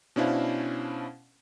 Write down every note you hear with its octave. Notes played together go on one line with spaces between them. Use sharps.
B2 C#4 D4 E4 C5 F5